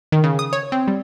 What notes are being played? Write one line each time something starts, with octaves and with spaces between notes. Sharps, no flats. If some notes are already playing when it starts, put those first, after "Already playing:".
D#3
C#3
D#6
C#5
C4
G3